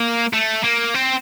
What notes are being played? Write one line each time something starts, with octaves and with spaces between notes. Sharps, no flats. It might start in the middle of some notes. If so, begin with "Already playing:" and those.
Already playing: A#3
A3
A#3
C4